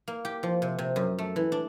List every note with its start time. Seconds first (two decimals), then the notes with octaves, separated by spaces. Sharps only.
0.08 A#3
0.25 G4
0.43 F3
0.62 C3
0.79 C3
0.96 F#2
1.19 A3
1.36 E3
1.52 D4